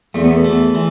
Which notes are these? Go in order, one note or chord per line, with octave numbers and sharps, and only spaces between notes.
E2 A3
B3
A3
E3
E3